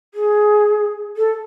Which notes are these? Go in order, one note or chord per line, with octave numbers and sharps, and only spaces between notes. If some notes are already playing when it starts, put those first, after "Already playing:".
G#4
A4